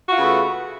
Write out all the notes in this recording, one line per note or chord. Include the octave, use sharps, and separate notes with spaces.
C#3 A3 B3 F4 F#4